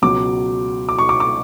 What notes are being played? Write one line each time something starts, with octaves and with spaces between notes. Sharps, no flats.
C#2 B2 F#3 D6
D6
C#6
D6
D6